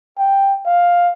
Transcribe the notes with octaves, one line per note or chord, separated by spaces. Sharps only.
G5
F5